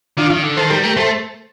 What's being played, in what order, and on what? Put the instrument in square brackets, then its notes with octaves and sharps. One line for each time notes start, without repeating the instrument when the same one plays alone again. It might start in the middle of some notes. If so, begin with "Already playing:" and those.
[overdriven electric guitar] D#3 [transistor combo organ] D4 F4
[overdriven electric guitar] D#3
D3
[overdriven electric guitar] D#3 [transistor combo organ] A4 C5
[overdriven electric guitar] G3 [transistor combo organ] G4 A#4
[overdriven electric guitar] A3 [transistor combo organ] G4 A#4
[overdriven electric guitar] A3 [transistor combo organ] A4 C5